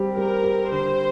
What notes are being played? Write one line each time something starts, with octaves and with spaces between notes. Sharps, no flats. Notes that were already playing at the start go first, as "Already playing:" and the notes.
Already playing: G3 C4 G4
G3 A#4
G4
D3 C5